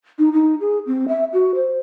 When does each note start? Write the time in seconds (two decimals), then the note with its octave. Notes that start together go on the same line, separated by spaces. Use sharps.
0.19 D#4
0.33 D#4
0.61 G#4
0.87 C4
1.08 E5
1.33 F#4
1.55 C5